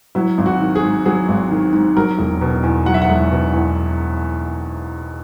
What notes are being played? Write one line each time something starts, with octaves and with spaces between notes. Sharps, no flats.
F#3 E4
G#1
F#4
D#3
G#4
G#2
F#3 G#4
G#1
D#3
G#2
F#3 A#4
E1
B2
E2
F#3 F#5
E5
F#5
E1
B2
E2